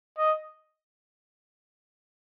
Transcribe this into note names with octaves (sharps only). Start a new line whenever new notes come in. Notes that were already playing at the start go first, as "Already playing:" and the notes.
D#5